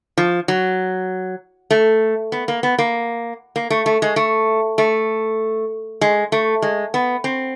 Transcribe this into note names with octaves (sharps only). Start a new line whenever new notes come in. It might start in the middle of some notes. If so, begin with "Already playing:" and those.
F3
F#3
A3
B3
A#3
B3
A#3
A#3
A3
A3
G#3
A3
A3
G#3
A3
G#3
B3
C4